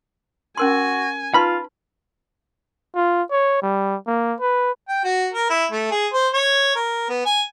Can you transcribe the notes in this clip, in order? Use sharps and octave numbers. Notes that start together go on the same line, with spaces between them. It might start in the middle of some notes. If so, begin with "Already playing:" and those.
C#4 F#4 A#4 G#5 C6
D#4 F4 B4 B5 C6
F4
C#5
G3
A#3
B4
G5
F#4
A#4
E4
A3
G#4
C5
C#5
A#4
B3
G#5